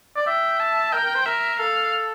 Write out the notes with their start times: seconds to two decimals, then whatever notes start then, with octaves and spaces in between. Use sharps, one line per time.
0.16 D5
0.27 E5 G5
0.60 A5
0.93 A#4 G5
1.04 A#4
1.15 C5
1.26 A#4 E5
1.59 A4 F5